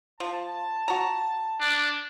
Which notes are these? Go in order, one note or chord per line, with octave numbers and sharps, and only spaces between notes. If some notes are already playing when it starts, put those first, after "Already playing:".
F3 A5
F#4 A#5
D4